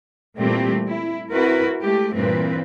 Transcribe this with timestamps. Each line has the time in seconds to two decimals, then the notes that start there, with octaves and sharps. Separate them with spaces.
0.40 A#2 E3 G3 A3 C4 G4
0.90 E4
1.32 C4 E4 F#4 A#4 B4
1.82 G#3 A3 G4
2.13 G2 A#2 E3 C4 B4